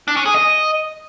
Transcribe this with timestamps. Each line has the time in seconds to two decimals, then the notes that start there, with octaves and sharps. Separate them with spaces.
0.08 D4
0.17 C#4
0.25 G#4
0.34 D#5